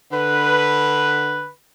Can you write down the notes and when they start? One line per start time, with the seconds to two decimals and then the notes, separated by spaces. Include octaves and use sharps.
0.13 D3 B4